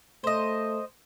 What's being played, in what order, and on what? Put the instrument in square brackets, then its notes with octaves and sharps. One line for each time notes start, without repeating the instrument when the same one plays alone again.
[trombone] A3 [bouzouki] C5 D#5